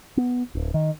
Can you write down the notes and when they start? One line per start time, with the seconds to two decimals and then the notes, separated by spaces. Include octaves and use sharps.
0.17 B3
0.55 D1
0.74 D#3